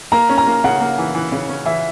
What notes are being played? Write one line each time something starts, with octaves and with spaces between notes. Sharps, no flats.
A#3 A#5
C#4
A#5
A#3
C#3 F#5
A#3
E3
E3
C#3
C#4
E3 E5